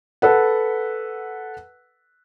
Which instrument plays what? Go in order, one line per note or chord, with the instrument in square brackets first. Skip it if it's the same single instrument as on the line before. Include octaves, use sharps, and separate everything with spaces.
[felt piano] A4 B4 F#5